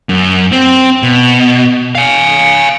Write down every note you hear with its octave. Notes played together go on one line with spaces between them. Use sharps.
F#2
C4
B2
F5 G#5